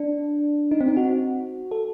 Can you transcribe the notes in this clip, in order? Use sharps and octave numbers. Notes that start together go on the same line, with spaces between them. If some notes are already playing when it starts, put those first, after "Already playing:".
Already playing: D4
D#4
C4
D#4
F#4
A4